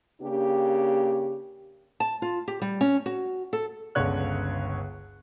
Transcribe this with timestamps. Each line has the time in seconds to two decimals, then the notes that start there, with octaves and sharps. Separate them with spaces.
0.22 C#3 A#3 D4 G4
2.00 A5
2.22 F4
2.48 G4
2.62 G3
2.81 C#4
3.06 F#4
3.53 A4
3.95 G1 C#2 D3 C#5 F#6